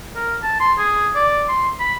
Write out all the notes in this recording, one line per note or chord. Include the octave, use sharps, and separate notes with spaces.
A#4
A5
C6
G#4
D5
C6
B5